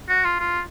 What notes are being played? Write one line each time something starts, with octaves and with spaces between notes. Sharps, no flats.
F#4
F4
F4